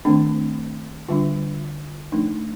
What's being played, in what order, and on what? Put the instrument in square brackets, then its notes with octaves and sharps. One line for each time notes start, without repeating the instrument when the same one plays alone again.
[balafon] D#3 A3 C4 D4
D3 G3 D4 F4
F3 A3 D4 D#4